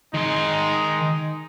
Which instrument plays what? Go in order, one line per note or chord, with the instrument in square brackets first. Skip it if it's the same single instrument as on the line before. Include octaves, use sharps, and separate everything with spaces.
[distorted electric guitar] D#3 C6 [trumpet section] G#3 D#4